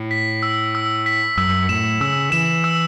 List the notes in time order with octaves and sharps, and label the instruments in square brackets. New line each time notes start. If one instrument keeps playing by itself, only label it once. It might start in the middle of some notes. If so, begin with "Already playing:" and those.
Already playing: [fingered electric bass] A2
[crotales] B6
E6
E6
B6
[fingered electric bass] F#2 [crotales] E6
[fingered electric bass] A2 [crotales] E7
[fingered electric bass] C#3 [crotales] E6
[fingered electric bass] E3 [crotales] E7
[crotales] E6